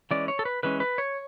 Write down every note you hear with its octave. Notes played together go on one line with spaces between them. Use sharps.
E3 G#3 C#4 D5
C#5
A4
B4
E3 G#3 C#4 B4
B4
C#5